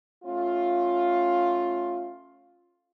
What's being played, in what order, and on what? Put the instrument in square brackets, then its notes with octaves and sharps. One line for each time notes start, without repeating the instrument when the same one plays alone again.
[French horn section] A3 C#4 F4